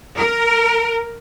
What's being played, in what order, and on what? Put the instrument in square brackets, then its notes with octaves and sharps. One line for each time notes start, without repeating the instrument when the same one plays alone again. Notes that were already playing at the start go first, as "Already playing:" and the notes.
[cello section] A#4